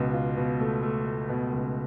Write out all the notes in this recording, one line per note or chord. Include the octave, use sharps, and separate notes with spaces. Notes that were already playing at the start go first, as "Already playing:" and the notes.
Already playing: C#2 B2
F4
B2
A3
A3
A3
B2
C#2